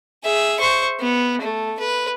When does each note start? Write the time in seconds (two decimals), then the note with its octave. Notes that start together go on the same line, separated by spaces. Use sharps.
0.24 G#4 E5
0.60 C5 C#6
1.00 B3
1.41 A3
1.79 B4